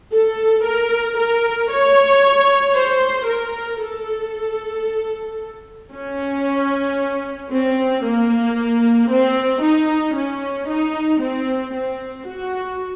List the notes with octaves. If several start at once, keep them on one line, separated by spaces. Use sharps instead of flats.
A4
A#4
A#4
C#5
C5
A#4
A4
C#4
C4
A#3
C4
D#4
C#4
D#4
C4
C4
F#4